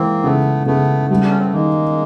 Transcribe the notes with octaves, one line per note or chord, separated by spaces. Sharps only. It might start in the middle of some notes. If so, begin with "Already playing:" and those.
Already playing: E3 G#3 A#3 C4
C#3 A3 B3
C#3 A3 B3
G3 A3 B3
D4
C#4
C4
B3
D#3 G#3 A#3